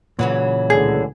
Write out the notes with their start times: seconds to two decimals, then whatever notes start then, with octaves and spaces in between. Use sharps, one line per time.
0.19 A#2 C#3 E3 F#3
0.70 C#2 A2 D3 G#4